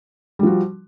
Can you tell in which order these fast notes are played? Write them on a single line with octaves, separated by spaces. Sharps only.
G3 F3 F#4